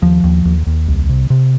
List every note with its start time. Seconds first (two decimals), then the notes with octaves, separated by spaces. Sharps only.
0.02 D#2 F3
0.24 D#2
0.45 D#2
0.66 D#2
0.88 C2
1.09 C3
1.30 C3